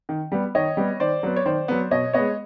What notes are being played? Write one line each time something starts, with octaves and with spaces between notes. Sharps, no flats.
D#3
G3 B3
D#3 C#5 D#5
G3 B3
D#3 C5 D5
F#3 B3
C#5
D#3 C5 D5
F#3 B3
B2 C#5 D#5
G#3 B3 C#5 D#5